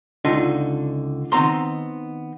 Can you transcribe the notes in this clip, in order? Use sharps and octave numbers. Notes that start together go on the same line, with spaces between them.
C#2 D3 D4 D#4 F4 D#5
D#3 B3 C4 D#4 A#5 C6